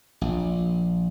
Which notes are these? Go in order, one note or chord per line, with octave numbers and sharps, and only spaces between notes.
A#1